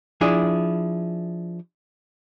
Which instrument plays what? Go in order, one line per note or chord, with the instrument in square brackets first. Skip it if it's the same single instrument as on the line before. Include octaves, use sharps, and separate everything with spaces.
[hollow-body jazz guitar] F3 D4 E4 G#4